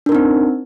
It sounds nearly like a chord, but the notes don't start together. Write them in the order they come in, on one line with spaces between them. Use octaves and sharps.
D4 A#4 D#4 C4